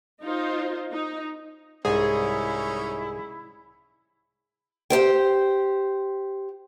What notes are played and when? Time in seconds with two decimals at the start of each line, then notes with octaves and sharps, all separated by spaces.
0.23 D#4 F4 C5
0.91 D#4
1.85 C2 G#2 C#4 D#4 E4 G#4 C#5
4.90 G4 C5 G5